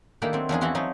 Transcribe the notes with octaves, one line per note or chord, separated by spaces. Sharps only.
D#3 A#3 D4 E4 G4 A4
F#3 C4
E2 F3 D4 G#4
E3 F3 E4 F#4 C6
F3 F#3 D#4